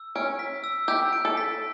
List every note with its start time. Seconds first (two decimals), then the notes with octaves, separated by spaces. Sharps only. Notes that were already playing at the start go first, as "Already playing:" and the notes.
Already playing: E6
0.15 C#4 D7
0.39 B6
0.64 E6
0.88 G4 E6
1.13 D7
1.25 A4
1.37 B6